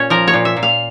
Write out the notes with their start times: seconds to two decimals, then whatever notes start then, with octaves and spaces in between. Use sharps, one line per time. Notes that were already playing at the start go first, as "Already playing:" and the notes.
Already playing: A#2 C#4 C#5
0.10 F3 A#4
0.28 C#5
0.34 A#2
0.45 E5
0.57 A#2
0.63 F5